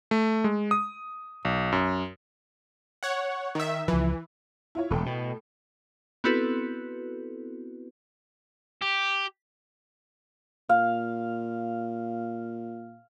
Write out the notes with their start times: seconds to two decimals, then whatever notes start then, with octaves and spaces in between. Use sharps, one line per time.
0.11 A3
0.44 G#3
0.71 D#6
1.45 B1
1.72 F#2
3.03 C#5 F#5
3.55 D#3 E5
3.88 C#2 E3 F3
4.75 E4 F4 C#5
4.90 E1 A2 A4 G5
5.06 B2
6.24 B3 C4 E4 F#4 A4 B4
8.82 G4
10.69 A#2 F5